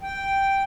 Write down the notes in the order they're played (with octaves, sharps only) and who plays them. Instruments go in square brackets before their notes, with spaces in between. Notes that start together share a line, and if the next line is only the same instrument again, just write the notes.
[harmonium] G5